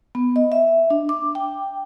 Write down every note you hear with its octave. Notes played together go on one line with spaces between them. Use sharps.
B3
D#5
E5
D4
D6
G5